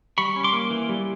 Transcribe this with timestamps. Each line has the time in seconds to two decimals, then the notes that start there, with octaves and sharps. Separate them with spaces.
0.18 G3 B5 C#6
0.36 C#4
0.44 C6 D6
0.53 A#3
0.70 E3
0.89 G3